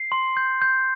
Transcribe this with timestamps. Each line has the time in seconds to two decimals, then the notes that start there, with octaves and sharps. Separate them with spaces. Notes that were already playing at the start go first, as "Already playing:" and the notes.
Already playing: C7
0.12 C6
0.37 G6
0.62 G6